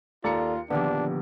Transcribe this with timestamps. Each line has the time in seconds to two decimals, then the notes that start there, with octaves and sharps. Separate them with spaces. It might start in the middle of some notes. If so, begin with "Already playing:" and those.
0.24 D#2 F4 A4 D5 A#5 C#7
0.70 A#1 D3 D#3 F3 B3 D4 G4